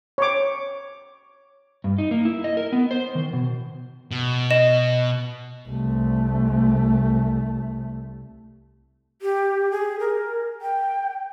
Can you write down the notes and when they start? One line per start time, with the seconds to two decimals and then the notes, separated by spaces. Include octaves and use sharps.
0.18 C#5 D6
1.84 G2
1.98 D#4
2.11 A#3
2.25 E4
2.44 D#5
2.57 A#4
2.72 B3
2.91 C5
3.15 D#3
3.33 B2
4.11 B2
4.51 D#5 E7
5.68 C2 A3
9.22 G4
9.71 G#4
10.00 A#4
10.62 G5